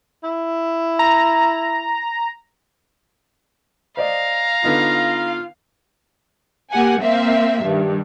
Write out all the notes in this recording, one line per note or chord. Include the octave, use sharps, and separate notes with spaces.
E4
A#5
C5 D5 D#5 F5 A#5
D3 B3 D#4 F4
A#3 G4 F#5 G#5
A#3 C4 E5 F5
G2 D#3